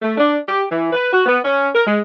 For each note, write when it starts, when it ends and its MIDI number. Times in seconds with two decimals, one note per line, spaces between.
0.02 0.15 57
0.18 0.36 62
0.48 0.63 67
0.68 0.89 52
0.92 1.12 71
1.12 1.26 66
1.26 1.37 59
1.43 1.68 61
1.73 1.84 70
1.85 1.99 56